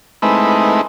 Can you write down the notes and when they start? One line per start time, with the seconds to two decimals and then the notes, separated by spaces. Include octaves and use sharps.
0.22 G#3 A3 C4 D#4 E4 B4